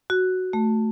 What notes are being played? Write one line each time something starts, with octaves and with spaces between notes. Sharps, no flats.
F#4
A3